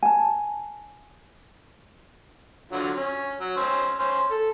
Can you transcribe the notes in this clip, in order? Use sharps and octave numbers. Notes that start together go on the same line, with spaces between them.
G#5 A5
D3 F#3 F4
C#4
F#3
C#4 C5 E6
C#4 C5
A4